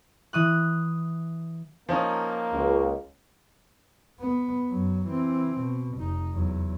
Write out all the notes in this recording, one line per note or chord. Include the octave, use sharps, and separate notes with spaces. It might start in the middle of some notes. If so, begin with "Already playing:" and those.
E3 D#6 F#6
F3 A#3 C#4 D#4
C#2
B3
F#2 F#3
E3 C4
B2
F1 D#4
E2 F#3